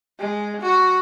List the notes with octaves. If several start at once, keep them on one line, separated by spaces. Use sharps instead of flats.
G#3
F#4